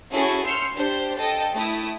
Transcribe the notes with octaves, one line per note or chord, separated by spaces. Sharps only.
C#4 E4 F#4 G#4 A4
C6 E6 F6 G6 C7 C#7
D4 G4 C5 G6
A4 D#5 G5
A3 E4 D#6